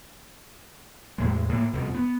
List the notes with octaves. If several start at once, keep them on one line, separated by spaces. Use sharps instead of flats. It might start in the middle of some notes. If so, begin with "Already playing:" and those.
E2 A2 G#3
A2 A#3
C2 F2 B2 F3
B3